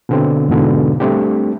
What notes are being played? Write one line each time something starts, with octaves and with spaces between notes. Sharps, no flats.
B2 D3 C4
E2 G#2 B2 D3
G3 A3 C4 D4 G4